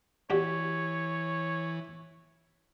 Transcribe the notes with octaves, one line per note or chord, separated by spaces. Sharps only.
E3 D4 F#4 G4 C#5